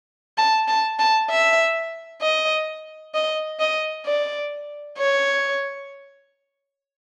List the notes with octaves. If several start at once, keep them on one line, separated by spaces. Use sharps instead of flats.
A5
A5
A5
E5
D#5
D#5
D#5
D5
C#5